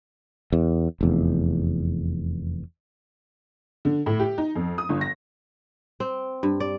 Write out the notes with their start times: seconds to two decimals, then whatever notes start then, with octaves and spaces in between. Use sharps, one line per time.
0.53 E2
1.01 F1 E2
3.85 D3
4.06 A2
4.20 G4
4.38 D#4
4.55 F2
4.78 D#6
4.89 G1
5.01 A#6
6.00 C4
6.43 G2
6.60 D5